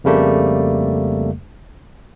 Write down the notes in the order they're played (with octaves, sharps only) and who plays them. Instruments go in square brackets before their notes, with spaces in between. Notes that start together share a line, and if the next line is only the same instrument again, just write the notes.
[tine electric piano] F2 C#3 G3 A3 A#3